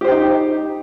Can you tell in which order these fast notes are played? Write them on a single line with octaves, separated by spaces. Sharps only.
G4 C5 G5 D#4